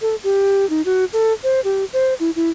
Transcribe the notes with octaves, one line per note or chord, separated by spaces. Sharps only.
A4
G4
D#4
F#4
A4
C5
G4
C5
E4
E4